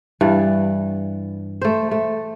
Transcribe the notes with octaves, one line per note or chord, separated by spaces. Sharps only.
G2 E3 D5
A3 C5
A3